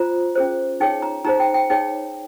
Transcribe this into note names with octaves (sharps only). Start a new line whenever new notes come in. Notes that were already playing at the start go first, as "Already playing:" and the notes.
Already playing: F4 C5 A#5
C#4 G#4 C5
D#4 G#4 C#5 G5
A#5
D#4 G#4 C5 A#5
G5
G5
D#4 G#4 C#5 G5